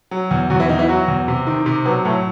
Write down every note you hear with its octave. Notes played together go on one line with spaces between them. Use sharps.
F#3
E2
E2 F#3 F#4
E3 E4
E2 D#3 D#4
E3 E4
F#3 F#4
E2
C3
D#3
C3
B2 F#3 B3
A2 F#3 A3